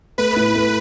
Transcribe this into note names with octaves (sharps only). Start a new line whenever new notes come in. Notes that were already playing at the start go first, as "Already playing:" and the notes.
A3 B4
A2
A3